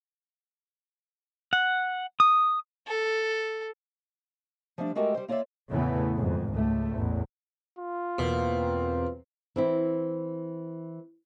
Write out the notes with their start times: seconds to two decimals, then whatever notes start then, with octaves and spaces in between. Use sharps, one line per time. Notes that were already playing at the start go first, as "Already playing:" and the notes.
1.53 F#5
2.20 D#6
2.87 A4
4.78 F3 G3 A3 D4
4.95 G#3 A3 F#4 G4 A4 A#4
5.14 G3 C5
5.28 A#3 F4 C#5 D5 E5
5.71 E2 A2 C#3 E3 A3 B3
6.14 G#1 F2 G#2
6.52 C#2 A3
6.95 A1 E2
7.79 F4
8.19 E2 B2 A#3 C4
9.56 E3 C4 E4